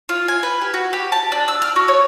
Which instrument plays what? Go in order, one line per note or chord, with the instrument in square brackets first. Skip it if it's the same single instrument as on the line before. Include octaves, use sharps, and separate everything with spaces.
[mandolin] F4
G#5
B4
G4
F#4
G4
A5
D4
E6
F6
F#4
C#5